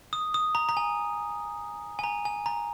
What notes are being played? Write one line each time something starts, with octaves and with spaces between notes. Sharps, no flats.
D#6
D#6
A#5
A#5
G#5
G#5
A#5
G#5
A#5